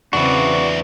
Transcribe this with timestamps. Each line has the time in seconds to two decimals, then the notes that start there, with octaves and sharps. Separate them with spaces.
0.13 E2 C#3 C4 D4 E4 F#4 D5